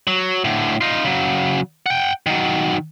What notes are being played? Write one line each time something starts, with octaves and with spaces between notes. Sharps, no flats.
F#3
A2 D3
D#4 F4
C#3 F#3
F#5 G5
D#3 F#3